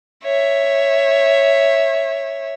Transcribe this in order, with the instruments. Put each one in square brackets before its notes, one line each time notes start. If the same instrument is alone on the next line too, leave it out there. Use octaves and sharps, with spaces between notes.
[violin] C#5 E5